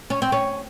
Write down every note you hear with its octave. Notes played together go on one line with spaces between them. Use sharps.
C#4
C4
C#4